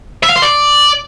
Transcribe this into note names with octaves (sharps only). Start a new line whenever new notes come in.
E5
F5
C5
D5